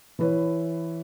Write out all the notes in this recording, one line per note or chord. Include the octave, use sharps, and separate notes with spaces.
E3 E4 B4 C#5